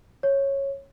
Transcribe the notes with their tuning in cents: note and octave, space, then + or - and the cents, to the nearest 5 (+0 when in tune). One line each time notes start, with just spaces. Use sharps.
C#5 -10